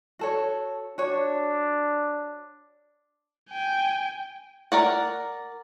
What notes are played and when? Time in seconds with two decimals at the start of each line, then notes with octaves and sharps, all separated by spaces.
0.19 F#4 A4 C#5
0.98 D4 F#4 C#5
3.50 G5 G#5
4.72 A#4 D5 F#5